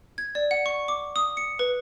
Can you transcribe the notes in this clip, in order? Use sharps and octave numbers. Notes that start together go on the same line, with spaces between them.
G#6
D5
F#5
C#6
D6
D#6
C#7
B4